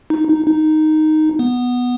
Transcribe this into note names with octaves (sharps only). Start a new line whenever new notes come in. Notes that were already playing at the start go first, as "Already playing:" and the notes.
D#4
D#4
D#4
B3